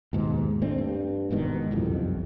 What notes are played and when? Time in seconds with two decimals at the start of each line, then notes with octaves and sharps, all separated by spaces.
0.13 D#2 G#2 B2
0.62 A3 C4 D4
0.78 G2
1.31 E1 G#2 B2 D#3
1.71 F#1 C2 F2